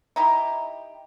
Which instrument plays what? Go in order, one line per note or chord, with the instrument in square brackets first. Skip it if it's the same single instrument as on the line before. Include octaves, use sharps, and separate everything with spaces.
[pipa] D#4 E4 G4